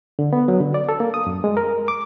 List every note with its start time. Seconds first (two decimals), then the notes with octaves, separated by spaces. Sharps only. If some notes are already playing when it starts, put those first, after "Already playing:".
0.19 D3
0.33 B3
0.48 F#3
0.60 D3
0.74 D5
0.89 A4
1.00 A#3
1.14 D#6
1.27 F#2
1.44 G#3
1.57 A#4
1.88 D6